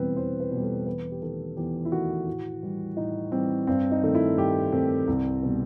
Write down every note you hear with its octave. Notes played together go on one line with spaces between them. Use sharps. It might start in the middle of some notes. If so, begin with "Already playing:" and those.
Already playing: E2 B2 G3 C4 B4
E2 C5
B4
B2 G3
A4
E2 B4
G4
D#3 A3 A4
E2 G4
E4
D#3 A3 F#4
A2
E3 G3
A2 D#4
E3 G3 C4
G2 C4
D#4
D#3 A3
E4
G2 G4
D#3 A3 C4
C2
B2 G3